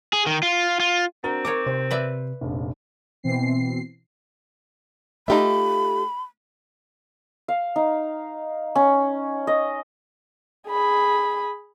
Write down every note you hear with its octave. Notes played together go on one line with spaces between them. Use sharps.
G#4
D#3
F4
F4
C4 D4 F#4 A#4 A#5
D#4 A#4 C#5 D6
C3 C5
B4 D5 E5
F1 A#1
B2 E3 C4 C7
A3 D#4 F4 G4 E5 B5
F5
D#4
C#4
D#5
G#4 B5